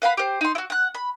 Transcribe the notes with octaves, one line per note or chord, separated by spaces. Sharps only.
B4 F5 F#5 B5
G4 C5
D#4 C6
E4 F#4
F#5 F#6
B5